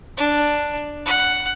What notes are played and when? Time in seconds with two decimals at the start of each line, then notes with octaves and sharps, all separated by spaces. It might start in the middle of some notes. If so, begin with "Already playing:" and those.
0.17 D4
1.06 F#5